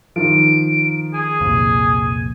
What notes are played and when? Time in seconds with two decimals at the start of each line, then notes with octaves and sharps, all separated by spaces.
0.16 D#3 F3 D7
1.14 G#4 G#5
1.40 C2 F2 A#2